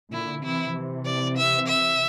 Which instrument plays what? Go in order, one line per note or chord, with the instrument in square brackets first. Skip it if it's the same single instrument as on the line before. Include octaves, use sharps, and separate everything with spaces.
[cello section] A#2 D3 [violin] E4
[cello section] C3 E3 [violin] E4
[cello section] C3 E3
[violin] D5
E5
E5